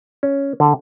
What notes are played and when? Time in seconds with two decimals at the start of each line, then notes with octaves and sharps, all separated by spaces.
0.23 C#4
0.60 D3